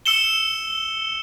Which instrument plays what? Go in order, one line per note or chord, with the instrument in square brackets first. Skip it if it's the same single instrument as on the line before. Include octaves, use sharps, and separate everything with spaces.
[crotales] E6 C#7 E7 G7